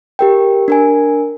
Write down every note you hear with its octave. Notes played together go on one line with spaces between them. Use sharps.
G4 A#4 G5
D4 A#4 G#5